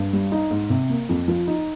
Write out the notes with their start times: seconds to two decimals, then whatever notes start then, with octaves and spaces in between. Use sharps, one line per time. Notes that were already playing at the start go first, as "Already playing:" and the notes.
Already playing: G2
0.13 G3
0.32 D#4
0.51 G#2
0.70 C3
0.89 A#3
1.09 F2
1.28 F3
1.47 D#4